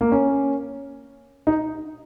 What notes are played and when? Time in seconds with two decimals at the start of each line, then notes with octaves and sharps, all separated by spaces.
0.01 A#3
0.12 C#4
1.47 D#4